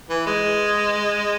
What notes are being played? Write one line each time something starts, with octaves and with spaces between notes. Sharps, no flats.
E3
G#3